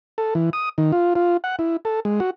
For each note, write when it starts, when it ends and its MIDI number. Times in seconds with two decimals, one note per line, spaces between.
0.18 0.34 69
0.35 0.50 52
0.53 0.69 87
0.78 0.92 51
0.92 1.14 65
1.15 1.37 65
1.44 1.56 78
1.59 1.77 64
1.85 2.00 69
2.05 2.20 56
2.20 2.30 66